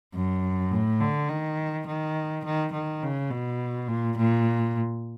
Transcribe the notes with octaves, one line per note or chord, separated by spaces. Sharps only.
F#2
A2
D3
D#3
D#3
D#3
D#3
C#3
B2
A#2
A#2